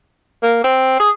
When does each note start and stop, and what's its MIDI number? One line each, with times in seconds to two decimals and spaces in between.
0.43 0.61 58
0.64 0.95 60
1.00 1.09 68